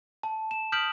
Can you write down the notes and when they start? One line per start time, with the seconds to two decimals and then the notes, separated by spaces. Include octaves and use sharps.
0.23 A5
0.51 E7
0.72 D#6 F6 G6 B6 D7 F#7